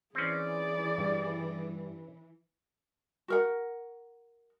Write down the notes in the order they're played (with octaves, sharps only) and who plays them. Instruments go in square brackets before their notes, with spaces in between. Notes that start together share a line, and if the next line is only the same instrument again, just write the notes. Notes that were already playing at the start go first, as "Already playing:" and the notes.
[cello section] E3 [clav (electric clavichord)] C4 C#4 [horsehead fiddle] G#4 D5
[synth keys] G2
[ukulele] F#4 A#4 F#5